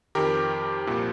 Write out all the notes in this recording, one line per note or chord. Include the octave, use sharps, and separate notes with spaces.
F2 D#3 G4 A#4
C2 A#2 F3